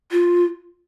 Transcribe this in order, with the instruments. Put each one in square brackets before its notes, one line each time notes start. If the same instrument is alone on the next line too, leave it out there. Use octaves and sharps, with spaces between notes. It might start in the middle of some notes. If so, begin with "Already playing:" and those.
[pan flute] F4